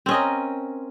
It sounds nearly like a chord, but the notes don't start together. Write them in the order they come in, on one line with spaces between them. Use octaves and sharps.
C4 C#4 D#5 A#4